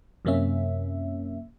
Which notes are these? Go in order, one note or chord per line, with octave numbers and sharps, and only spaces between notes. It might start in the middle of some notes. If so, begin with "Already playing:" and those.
F#2 C3 A#3 C#4 E5